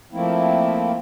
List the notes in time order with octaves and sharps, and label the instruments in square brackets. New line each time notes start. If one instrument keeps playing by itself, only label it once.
[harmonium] F3 A3 A#3 C4 E4